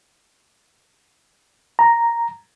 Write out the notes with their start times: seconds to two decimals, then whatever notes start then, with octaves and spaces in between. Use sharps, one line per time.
1.79 A#5